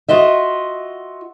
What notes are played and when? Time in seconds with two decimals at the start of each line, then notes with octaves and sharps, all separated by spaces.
0.08 F4 F#4 D#5 E5